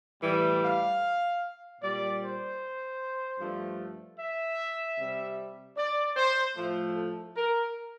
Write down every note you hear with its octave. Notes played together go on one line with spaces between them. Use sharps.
A2 E3 G3
F5
A#2 G3 D5
C5
G2 F3 A3
E5
C3 G3
D5
C5
A2 F3 A3
A4
A#4